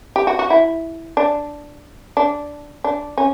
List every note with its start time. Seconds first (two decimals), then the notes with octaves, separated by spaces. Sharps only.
0.16 G4
0.27 F#4
0.39 F#4
0.50 E4
1.17 D4
2.17 D4
2.84 D4
3.18 C#4